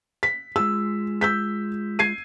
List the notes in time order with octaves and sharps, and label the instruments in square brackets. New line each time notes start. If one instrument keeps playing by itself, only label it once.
[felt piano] B6
[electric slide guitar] G#3 F4 G#4 [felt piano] E6
[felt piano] E6 G6 B6
G#6 C7 D#7